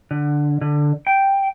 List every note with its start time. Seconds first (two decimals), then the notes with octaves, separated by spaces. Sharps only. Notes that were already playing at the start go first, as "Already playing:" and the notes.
0.11 D3
0.61 D3
1.07 G5